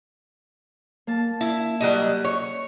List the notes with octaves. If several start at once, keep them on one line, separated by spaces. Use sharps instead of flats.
A#3 A5
E4
F#3 G3 D#5
C#5